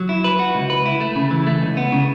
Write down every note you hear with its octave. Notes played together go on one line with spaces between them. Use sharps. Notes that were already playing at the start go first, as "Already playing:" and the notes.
Already playing: F#3
E4
B4
F#4
C#2
B4
E4
A3
C#3
E3
A3
C#2
B3
C#3